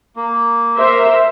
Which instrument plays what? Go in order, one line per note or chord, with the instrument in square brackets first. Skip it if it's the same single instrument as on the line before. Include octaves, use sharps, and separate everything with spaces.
[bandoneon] A#3
[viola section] A#4 C5 E5